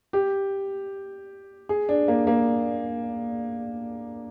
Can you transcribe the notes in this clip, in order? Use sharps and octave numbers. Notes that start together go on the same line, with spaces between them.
G4
G#4
D4
A#3
A#3